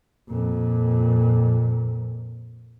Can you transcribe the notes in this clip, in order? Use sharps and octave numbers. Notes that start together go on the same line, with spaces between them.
F2 A#2